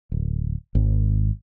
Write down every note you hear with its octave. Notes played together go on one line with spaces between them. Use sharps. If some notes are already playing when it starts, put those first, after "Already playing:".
D1
G#1